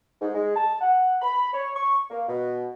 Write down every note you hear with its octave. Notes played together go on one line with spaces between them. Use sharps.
G#2
G#3
A5
F#5
B5
C#5
C#6
A#3
B2